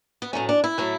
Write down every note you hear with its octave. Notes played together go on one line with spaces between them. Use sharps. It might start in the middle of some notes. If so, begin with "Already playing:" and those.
B3
A2 F#3 A3 C#4
D4
E4
A2 F#3 A3